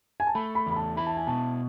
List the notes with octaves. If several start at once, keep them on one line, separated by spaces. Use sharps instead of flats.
G#5
A5
A3 B5
B5
E2 B5
A5
E4 B5
A5
G#5
B2 A5